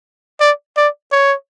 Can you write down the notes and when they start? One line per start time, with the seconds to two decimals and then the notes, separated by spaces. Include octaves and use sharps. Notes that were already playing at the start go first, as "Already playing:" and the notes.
0.40 D5
0.77 D5
1.12 C#5